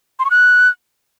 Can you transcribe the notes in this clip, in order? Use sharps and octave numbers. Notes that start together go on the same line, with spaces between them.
C6
C#6
F#6